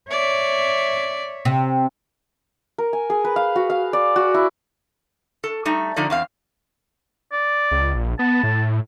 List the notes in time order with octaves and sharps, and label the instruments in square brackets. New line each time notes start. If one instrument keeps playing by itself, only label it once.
[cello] C#5 E5 [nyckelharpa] D5
[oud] C3
[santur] A#4
G#5
G#4
B4
F5
F#4
F5
D5
F#4
E4
[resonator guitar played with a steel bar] A4
G3 A3 D#4
D3 F3 D#4 D5
E2 C4 F5
[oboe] D5
[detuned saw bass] C#2
A#1
[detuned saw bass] B3 [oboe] A5
[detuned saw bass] A2